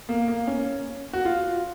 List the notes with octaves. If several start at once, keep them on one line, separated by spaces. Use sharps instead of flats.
A#3
A#3
C#4
F#4
F4